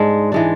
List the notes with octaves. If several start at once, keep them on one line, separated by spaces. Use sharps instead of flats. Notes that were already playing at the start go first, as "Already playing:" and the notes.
Already playing: G#2 G#3 D4
E3 G#3 D4